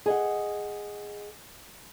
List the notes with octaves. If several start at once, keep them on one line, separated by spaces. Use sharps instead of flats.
G#4 D#5 F#5